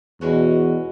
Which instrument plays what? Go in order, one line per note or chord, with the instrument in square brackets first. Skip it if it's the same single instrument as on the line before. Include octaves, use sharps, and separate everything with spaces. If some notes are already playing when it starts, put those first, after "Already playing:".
[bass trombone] E2 [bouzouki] B2 G#3 C#4 F#4